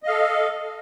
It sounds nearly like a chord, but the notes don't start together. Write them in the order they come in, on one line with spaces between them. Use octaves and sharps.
D#5 F5 A4